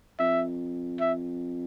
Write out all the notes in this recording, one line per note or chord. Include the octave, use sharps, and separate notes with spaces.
F2 E5
E5